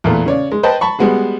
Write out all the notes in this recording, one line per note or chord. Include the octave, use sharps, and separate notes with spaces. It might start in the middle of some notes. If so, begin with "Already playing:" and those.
E2 A#2 A3 B3
C#3 C#5 D5
G#3
B4 C5 D#5 G5 A5
A5 B5 C#6
G3 G#3 B3 F#4 G#4